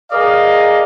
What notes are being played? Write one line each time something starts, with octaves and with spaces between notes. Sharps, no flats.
G#4 A#4 D5 D#5 F5